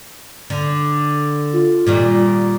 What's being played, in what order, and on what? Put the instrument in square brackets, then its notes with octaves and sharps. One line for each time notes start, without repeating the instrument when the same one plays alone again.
[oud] D3
[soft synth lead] F4
[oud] A#2 D#3 G3